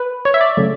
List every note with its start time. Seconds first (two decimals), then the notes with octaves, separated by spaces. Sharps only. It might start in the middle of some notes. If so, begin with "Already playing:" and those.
Already playing: B4
0.25 C#5
0.34 E5
0.41 D5
0.57 C#3 F#3 A3